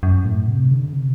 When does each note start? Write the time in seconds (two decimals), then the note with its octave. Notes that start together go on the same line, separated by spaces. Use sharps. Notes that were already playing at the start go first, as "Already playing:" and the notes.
0.03 F#2
0.25 A2
0.48 C3
0.71 D3
0.93 C3